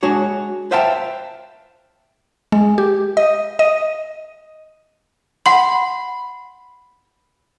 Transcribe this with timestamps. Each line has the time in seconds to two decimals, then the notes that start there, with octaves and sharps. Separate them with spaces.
0.03 G#3 D4 F#4 C#5
0.71 B4 C5 E5 F5 G5 A5
2.52 G#3
2.78 G4
3.17 D#5
3.59 D#5
5.46 F#5 B5 C6